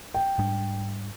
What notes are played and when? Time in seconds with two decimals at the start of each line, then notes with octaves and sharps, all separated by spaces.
0.14 G5
0.39 G#2 G3 D4